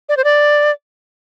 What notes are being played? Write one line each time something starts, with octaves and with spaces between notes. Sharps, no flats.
D5
C5
D5